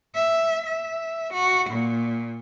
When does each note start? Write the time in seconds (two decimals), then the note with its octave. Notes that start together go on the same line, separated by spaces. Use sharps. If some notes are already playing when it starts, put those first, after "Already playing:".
0.15 E5
0.66 E5
1.33 F#4
1.69 A#2